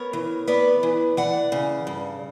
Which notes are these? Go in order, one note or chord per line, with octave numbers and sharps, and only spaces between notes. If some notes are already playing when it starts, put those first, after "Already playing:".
Already playing: B3 A#4 C#5
E3
B3 B4 D5
E3
E3 D5 F#5
C#3
G2